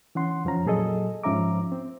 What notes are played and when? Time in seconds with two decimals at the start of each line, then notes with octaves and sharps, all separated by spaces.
0.15 E3 C#4 F#5 C6
0.45 F2 F3 C#4 A#5
0.66 A#2 F#3 G#4 A4 D#5
1.23 G#2 F3 C#4 E5 A#5 D6
1.72 C4